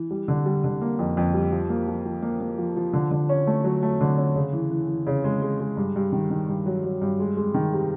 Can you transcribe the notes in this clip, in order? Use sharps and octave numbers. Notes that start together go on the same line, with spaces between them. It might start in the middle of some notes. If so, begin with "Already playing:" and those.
Already playing: E3
G3
D3
G3
D3
A#3
F2
F2
G3
F3
A#3
F3
F3
A#3
A#3
F3
F3
D3
D3
C#4
A3
F#3
A3
D3
C#4
C#3
E3
E3
E3
C#3
G#3
G#3
G#3
G2
G2
D#3
D#3
G2
F#3
F#3
G2
G#3
G#3
D#3
C3